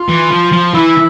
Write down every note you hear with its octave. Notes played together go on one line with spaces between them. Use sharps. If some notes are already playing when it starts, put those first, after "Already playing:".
Already playing: F4
E3
F3
F3
E3 E4